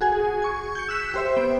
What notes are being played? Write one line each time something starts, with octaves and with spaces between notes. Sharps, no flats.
F#4 G#4 G#5
C#6 G#6
G6 C#7
E6 F#6 B6 E7
G4 C5 E5
B3 D7